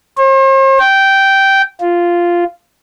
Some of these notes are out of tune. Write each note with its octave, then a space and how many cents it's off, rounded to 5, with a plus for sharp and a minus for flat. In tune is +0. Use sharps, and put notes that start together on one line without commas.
C5 +45
G5 -10
F4 -5